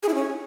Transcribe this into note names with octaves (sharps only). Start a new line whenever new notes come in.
G#4
E4
C#4